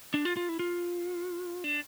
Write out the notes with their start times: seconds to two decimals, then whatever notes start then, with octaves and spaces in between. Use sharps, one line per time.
0.14 D4
0.25 F4
0.37 F4
0.49 E4
0.59 F4
1.64 D4